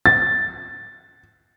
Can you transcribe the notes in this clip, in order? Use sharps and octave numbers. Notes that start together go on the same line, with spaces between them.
A6